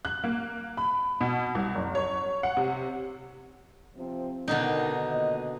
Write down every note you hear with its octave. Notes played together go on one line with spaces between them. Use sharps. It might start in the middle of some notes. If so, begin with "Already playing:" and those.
F#6
A#3
B5
B2
C2
F#1
C#5
F#5
C3
C3 F3 C4
B2 D3 D#3 D#4
A#2 D#5